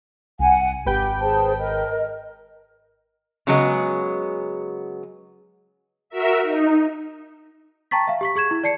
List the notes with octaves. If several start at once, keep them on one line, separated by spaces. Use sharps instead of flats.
C2 F#5 G#5
G#1 G4 B4 G5
G#4 C5 A5
A#4 D#5
C#3 F#3 G#3 B3
F#4 A#4 E5
D#4
G5 A5 A#5 C#6 A6 B6
E5 F5
G4 C#6 B6
G#4 C#6 G#6 E7
E4
D5 A5 C7 C#7